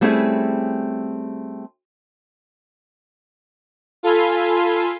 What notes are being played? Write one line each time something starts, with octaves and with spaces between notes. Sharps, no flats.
G3 A3 C4 C#4 E4 G#4
F4 A4 F5 G#5 B5 C6